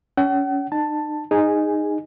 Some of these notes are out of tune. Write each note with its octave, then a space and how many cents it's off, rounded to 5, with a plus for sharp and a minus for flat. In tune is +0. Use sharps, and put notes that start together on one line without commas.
C#4 +25 F#5 +45
D#4 -40 A5 +5
D#4 -10 G#4 -20 G#5 +0